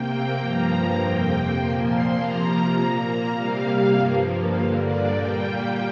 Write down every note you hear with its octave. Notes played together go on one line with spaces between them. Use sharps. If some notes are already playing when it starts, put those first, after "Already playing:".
Already playing: C3 A#3 G5
G2 F3 A#3 A#5
F2 C3 A#3 G5
A#2 F3 A#3 C6
C6
C3 F3 A#3 A#5
A#2 A#3 A#5
C3 G3 A#3 F5
G2 F3 A#3
G2 D3 A#3 F5
D5
A#2 G3 A#3 G5